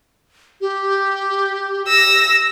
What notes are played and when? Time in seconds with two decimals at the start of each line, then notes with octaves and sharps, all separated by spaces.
0.61 G4
1.88 E6 A#6